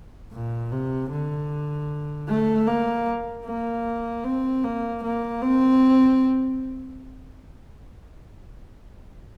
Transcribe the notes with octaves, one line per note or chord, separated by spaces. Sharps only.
A#2
C3
D3
A3
A#3
A#3
C4
A#3
A#3
C4